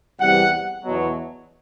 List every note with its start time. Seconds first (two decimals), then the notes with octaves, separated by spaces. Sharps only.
0.20 E2 C3 E3 G3 F#5
0.84 E2 B2 F#3